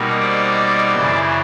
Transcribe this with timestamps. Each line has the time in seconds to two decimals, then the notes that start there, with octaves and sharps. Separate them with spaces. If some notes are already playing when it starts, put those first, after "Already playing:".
Already playing: B2 G3 A#3 D#4
0.20 C5 D5
0.93 F#2 C#3 E3